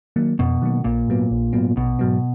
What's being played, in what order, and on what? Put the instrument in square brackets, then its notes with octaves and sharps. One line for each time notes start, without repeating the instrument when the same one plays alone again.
[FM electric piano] D#3 F#3 A#3
[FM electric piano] F2 [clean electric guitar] B2
[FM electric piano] D#3 F#3 A#3
[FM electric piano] A#1 [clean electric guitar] A#2
[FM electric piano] G#2 F#3 B3
A#1
G#2 F#3 B3
[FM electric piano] A#1 [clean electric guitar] B2
[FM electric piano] G#2 F#3 B3